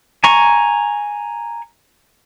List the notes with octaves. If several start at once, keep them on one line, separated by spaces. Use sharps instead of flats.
G#5 A#5 C#6